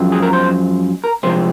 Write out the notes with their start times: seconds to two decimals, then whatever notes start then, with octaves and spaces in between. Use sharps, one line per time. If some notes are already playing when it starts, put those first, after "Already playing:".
Already playing: F#2 F3 G#3 C4
0.12 G#4
0.23 A#4
0.33 C5
1.04 A#4
1.23 C3 F3 G#3 C4 C5